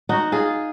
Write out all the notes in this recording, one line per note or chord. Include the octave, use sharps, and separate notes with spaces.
D#4 F#4
F4 G#4